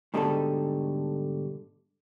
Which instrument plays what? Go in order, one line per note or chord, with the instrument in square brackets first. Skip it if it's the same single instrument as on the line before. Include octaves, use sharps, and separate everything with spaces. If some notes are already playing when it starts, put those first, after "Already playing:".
[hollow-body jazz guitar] G#2 B2 D3 G3 D#4 A4